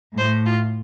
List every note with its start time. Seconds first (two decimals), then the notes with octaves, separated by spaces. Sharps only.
0.18 A2 C5
0.46 F4